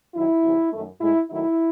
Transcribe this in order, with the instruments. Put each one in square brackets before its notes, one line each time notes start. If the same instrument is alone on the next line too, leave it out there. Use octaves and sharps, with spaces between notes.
[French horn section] F#2 D#3 F#3 E4
E2 C3 F#3
F#2 D#3 A3
A2 G#3 E4
F#2 D#3 F#3 A3 E4